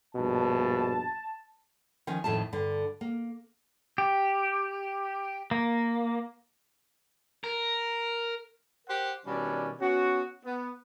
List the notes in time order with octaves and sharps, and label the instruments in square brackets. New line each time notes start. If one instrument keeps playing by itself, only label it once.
[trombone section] A#1 G2 B2 [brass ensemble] A5
[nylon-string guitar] D#3 F3 C#4
F2 A2 D#3 F3 A3 A5
G2 D3
A#3
[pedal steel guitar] G4
A#3
[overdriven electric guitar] A#4
[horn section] G4 A#4 C5 F#5
B2 D#3 G3 C#4 D4
B3 C#4 F#4
B3